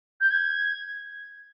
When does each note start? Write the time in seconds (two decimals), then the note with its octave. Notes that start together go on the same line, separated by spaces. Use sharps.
0.20 G6
0.31 G#6